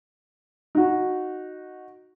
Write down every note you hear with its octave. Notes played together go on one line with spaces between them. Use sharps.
D#4 F#4